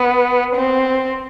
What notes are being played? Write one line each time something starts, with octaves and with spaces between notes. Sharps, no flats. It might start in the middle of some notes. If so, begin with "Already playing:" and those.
Already playing: B3
C4